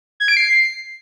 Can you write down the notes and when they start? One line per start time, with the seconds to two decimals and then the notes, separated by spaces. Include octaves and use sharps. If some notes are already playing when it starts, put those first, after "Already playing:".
0.20 G#6
0.28 D7
0.37 C7